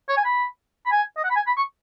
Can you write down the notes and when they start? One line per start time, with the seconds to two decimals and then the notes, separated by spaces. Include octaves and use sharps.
0.09 C#5
0.17 G#5
0.25 B5
0.86 B5
0.92 G#5
1.17 D#5
1.24 F#5
1.30 B5
1.36 G#5
1.47 B5
1.57 C#6